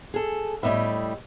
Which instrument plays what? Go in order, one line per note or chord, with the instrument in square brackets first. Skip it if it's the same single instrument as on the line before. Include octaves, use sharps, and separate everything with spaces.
[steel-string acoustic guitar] G#4 A4
A2 G3 B3 D#5 E5